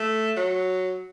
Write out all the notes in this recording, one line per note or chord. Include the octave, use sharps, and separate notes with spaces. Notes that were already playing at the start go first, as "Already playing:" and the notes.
Already playing: A3
F#3